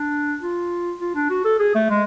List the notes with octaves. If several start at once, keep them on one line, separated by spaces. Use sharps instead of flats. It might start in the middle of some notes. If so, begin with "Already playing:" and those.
Already playing: D4
F4
F4
D4
F#4
A4
G#4
A3
G#3